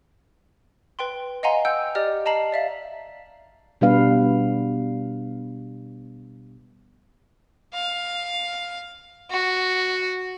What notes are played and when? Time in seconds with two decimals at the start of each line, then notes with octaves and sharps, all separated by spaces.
0.99 B4 G5 C6
1.43 D#5 F5 F#5 G#5 A#5 C6
1.65 F#5 G5 E6 G6
1.95 G4 D5 D#5 F6
2.26 D#5 A5 A#5 C7 F#7
2.52 D5 E5 F5
3.81 B2 G3 B3 D4 B4 F5
7.74 F5
9.31 F#4